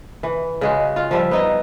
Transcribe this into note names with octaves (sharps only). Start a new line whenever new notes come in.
E3
C#3 G#3 F#4
F4 F5
F3 G3 E5
B3 D#4 D#5